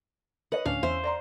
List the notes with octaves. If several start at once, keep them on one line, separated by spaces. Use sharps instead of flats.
B4 C#5 D#5 F#5
D2 A2 C#4 D4 C#5 F5
E2 C5 E5
D5 A#5 C6